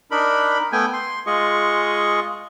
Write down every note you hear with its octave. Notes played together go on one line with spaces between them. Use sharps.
D4 D#4 A#4 B5
A3 B3 G5 G#5
C6
G#3 F4 G#4 D#5 C#6